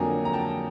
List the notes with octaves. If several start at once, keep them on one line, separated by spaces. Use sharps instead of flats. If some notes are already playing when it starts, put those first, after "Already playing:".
Already playing: F2 D3 F#3 A#3 G#5 A#5
A#5
G5 A5